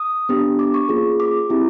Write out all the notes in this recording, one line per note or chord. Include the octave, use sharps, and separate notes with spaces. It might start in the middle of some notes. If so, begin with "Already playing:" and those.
Already playing: D#6
B3 D4 G4
D6
C#6
A#3 C#4 F4 G#4
D6
C4 E4 G4